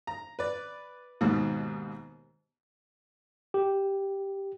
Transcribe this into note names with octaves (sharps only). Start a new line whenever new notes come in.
A#5
B4 D5
D#2 G#2 B2
G4